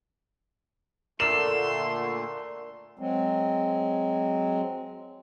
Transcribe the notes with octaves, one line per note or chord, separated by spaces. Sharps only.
A#2 D3 A3 A#4 D5 C6 E6 E7
F#3 G#3 C4